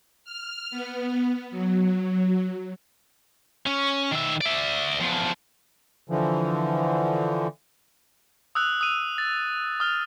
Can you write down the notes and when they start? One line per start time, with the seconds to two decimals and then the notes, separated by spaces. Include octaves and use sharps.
0.24 F6
0.71 B3
1.51 F#3
3.66 C#4
4.11 D#3 E5
4.41 D5 E5
5.00 E2 F3
6.10 D3 E3 F3
8.55 D#6 E6 F#6
8.81 D#6 D#7
9.18 A6
9.80 D#6 F6